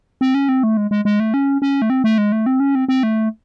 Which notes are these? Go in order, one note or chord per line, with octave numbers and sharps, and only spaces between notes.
C4
C#4
C4
A3
G#3
G#3
G#3
A3
C#4
C#4
A3
C4
A3
G#3
A3
C4
C#4
C4
C4
A3